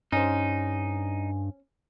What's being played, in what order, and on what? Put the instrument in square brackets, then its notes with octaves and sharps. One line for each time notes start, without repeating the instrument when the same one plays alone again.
[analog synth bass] G2 [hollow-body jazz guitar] C#4 C5 [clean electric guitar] D#4 [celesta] G#5